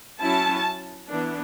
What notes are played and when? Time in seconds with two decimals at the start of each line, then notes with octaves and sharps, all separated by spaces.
0.21 F#3 C#4 E4 A5
1.10 E3 B3 D4